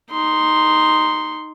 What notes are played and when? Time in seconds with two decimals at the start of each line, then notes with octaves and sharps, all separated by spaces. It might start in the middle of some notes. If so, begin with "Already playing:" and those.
0.11 D#4 C6